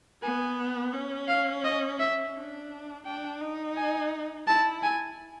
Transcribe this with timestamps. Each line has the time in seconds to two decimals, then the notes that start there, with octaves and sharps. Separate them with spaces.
0.22 B3 G#5
0.93 C#4
1.28 F5
1.64 D#5
1.99 E5
2.35 D4
3.05 D4 G5
3.41 D#4
3.77 G#5
4.47 E4 A5
4.83 G#5